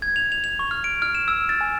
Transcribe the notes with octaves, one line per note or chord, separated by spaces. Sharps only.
G#6
F7
F7
F7
C#6
F6
D7
F6
E7
E6
A6
G#5